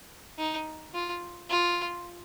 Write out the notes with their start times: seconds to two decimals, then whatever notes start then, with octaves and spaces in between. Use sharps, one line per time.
0.38 D#4
0.94 F4
1.49 F4